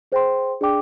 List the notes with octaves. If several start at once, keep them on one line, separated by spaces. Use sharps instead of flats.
G#4 C5 G5 C6
D4 G#4 D5 G5 D6